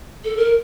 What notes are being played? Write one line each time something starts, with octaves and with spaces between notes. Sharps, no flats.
A4
A#4